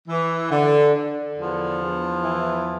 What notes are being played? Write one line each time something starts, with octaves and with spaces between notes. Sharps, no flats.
E3
D3
D3
E2 F3
E2
E3